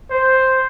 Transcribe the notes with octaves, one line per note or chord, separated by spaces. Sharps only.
C5